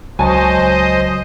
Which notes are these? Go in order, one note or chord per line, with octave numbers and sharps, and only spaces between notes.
C#2 F#3 C5 D#5 G#5 A5 C#6